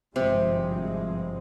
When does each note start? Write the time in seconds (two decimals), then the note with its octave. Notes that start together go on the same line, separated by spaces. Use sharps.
0.16 G#1 G2 C3 F3 G#3 C4